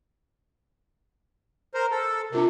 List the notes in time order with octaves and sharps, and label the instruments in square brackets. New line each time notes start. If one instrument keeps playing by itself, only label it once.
[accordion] A#4 C5
A4
[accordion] C3 [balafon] D4 F4 A#4